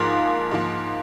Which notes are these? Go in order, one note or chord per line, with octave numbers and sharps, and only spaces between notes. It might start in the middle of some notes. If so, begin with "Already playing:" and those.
Already playing: G#2 F3 A#3 F4
G#2 F3 A#3 F4